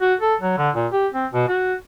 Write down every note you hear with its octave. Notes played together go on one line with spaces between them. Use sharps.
F#4
A4
F#3
D3
A#2
G4
C4
B2
F#4